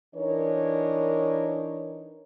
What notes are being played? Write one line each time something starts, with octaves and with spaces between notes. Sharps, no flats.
E3 D4 D#4 A#4 C#5